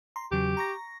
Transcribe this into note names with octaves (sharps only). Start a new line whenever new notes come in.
A#5 C6
E2 C#3 F#3 G4
A#5 C#6 A#6